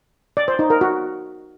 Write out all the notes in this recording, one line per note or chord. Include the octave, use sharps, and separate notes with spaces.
D5
C5
D#4
A#4
F#4